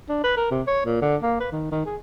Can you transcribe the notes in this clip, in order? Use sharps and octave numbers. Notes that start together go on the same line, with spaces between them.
D4
B4
A#4
C3
C#5
A#2
D3
A#3
B4
D#3
D#3
G#4